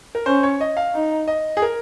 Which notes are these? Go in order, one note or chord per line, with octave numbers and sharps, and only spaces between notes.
A#4
C#4 C5
C#5
D#5
F5
D#4
D#5
G#4
A#4